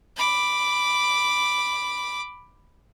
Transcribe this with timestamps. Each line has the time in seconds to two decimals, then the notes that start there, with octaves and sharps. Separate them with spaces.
0.16 B5 D6